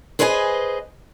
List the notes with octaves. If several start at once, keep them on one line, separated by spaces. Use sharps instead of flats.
G#4 B4 C5 D#5 F5 G#5